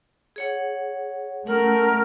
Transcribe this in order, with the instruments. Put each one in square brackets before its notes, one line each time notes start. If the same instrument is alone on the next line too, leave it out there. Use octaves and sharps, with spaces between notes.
[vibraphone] G#4 C#5 F#5
[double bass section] A3 [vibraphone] C#4 F#5 [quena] A#4